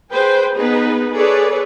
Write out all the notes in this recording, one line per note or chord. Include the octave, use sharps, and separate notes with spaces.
G#4 B4 C5 G5
B3 D#4 G#4 B4
G#4 A4 B4 C#5 D5